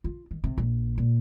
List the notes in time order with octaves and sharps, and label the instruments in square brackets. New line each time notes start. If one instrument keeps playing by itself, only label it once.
[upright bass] F4
D#3
C3
A#1
A#2